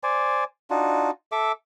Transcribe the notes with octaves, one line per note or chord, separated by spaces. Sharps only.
C5 D5 G#5
D4 D#4 F4 F#4
A4 E5 D6